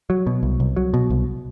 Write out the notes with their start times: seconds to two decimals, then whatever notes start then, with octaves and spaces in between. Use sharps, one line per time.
0.10 F#3
0.27 B2
0.43 C2
0.60 C2
0.76 F#3
0.94 B2
1.10 C2